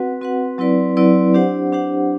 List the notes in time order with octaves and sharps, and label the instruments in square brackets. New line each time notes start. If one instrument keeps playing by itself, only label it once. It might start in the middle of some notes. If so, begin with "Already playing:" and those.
Already playing: [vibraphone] C4 F#4 B4 F#5
C4 F#4 B4 F#5
F#3 C4 E4 B4 D5
F#3 C4 E4 B4 D5
D4 G4 C5 F#5
D4 G4 C5 F#5